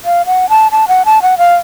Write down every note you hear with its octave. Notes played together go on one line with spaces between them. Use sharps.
F5
F#5
A5
A5
F#5
A5
F#5
F5